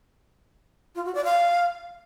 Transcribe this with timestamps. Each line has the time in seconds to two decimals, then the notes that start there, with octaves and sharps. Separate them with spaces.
0.95 F4
1.05 F#4
1.15 D5
1.24 F5